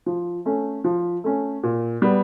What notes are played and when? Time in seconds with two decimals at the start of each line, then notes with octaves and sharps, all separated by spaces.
0.06 F3
0.45 A3 C#4
0.84 F3
1.24 A3 C#4
1.63 A#2
2.02 G3 B3